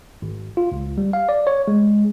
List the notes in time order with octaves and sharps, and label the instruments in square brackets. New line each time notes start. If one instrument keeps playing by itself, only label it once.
[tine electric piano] G#1
F4
C#2
G3
F5
D5
C#5
G#3